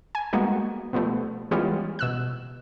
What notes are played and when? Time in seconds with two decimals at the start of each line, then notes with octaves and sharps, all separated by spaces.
0.15 G#5
0.33 G3 G#3 A#3 B3 D#4 F#4
0.93 B2 F3 G3 A3 B3
1.51 E3 G3 G#3 B3 C#4 F4
1.99 B2 E6 F#6